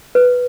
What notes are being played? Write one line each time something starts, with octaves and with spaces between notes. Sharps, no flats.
B4